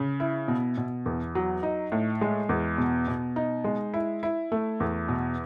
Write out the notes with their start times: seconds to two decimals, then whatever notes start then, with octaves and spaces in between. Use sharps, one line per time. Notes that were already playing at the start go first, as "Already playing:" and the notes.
Already playing: C#3
0.20 E4
0.48 B2
0.78 B2
1.06 E2
1.35 F#3
1.63 D#4
1.92 A2
2.21 G#3
2.49 E2
2.78 B2
3.08 B2
3.36 D#4
3.64 G#3
3.94 E4
4.23 E4
4.52 A3
4.80 E2
5.09 B2